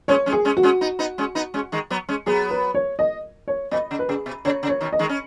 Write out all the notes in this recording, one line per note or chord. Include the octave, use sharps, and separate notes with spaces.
G#3 C#4 C#5
G#3 C#4
G#4
G#3 C#4
F#4
G#3 C#4
B3 D#4
B3 D#4
G#3 C#4
B3 D#4
G#3 C#4
D#3 G#3
F#3 B3
G#3 C#4
F#3 B3 G#4
B4
C#5
D#5
C#5
B2 D#5
C#3
B4
C#3 G#4
B2
C#3 C#5
C#3
C#5
B2 D#3
D#5
D#3 G#3
C#4